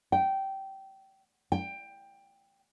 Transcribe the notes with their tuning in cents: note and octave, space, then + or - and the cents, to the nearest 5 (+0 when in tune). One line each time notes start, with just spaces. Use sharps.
G5 -15
G5 +15